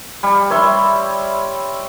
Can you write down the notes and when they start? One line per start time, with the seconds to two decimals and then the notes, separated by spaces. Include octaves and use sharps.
0.23 G3
0.50 C#5 E5 C6